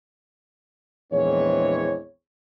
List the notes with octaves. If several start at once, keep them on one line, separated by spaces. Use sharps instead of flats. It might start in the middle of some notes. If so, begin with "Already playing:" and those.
A#1 E2 E3 G#3 C4 C#5